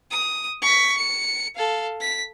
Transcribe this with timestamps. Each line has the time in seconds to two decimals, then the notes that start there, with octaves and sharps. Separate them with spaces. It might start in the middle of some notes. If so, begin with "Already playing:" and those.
0.11 D#6
0.62 C#6 B6
0.97 C#7
1.56 A4 F5
2.01 B6